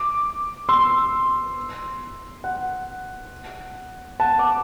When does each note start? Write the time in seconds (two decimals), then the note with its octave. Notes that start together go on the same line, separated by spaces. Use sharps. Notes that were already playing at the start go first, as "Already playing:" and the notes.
Already playing: D6
0.69 C6 E6
2.44 F#5
4.20 F#5 A5
4.39 D6